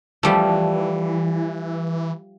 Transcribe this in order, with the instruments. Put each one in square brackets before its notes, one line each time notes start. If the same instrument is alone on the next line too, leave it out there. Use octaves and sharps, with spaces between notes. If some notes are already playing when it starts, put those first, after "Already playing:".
[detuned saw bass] E3 [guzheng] F3 G3 A3